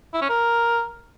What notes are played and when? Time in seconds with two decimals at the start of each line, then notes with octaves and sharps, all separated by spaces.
0.14 E4
0.22 C#4
0.29 A#4